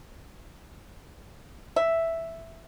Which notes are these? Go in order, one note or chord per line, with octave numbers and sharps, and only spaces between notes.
E5